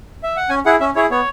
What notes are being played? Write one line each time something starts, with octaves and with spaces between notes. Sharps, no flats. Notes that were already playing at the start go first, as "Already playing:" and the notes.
E5
F#5
C#4 G#5
E4 G#4 F#5
C#4 E5
E4 G#4 C#5
B3 C#5